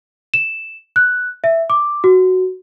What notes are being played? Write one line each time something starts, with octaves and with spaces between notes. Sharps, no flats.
E7
F#6
E5
D6
F#4